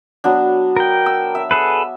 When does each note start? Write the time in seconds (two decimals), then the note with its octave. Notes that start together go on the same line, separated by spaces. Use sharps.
0.24 F#3 B3 D4
0.77 A#4 G5
1.06 E6
1.35 E5
1.51 G#4 A4 B4